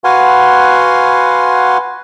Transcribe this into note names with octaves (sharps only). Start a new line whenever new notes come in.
F#4 B4 F5 F#5 G#5 C6